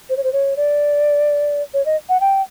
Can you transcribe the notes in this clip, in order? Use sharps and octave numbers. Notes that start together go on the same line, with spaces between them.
C5
C#5
C5
C#5
D5
C#5
D#5
F#5
G5